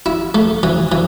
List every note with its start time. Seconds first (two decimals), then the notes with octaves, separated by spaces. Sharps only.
0.06 E4
0.34 A3
0.63 E3
0.92 E3